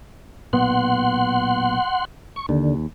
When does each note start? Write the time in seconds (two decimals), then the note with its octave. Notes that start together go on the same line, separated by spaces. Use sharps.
0.53 B1 A#2 B3 F#5 C6
2.36 C#6
2.49 D#2 D3